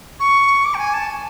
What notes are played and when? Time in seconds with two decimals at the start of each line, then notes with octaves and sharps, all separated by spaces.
0.20 C#6
0.65 D6
0.74 G5
0.79 G#5
0.94 A5